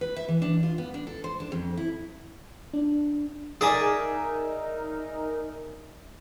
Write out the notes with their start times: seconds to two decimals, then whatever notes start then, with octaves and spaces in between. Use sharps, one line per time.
0.01 B4
0.16 E5
0.28 E3
0.42 D4
0.63 F4
0.78 B3
0.94 D4
1.07 A4
1.24 C5
1.40 D4
1.52 F2
1.77 E4
2.73 D4
3.61 D#4 G#4 A#4 D5 E5 G#5 D#6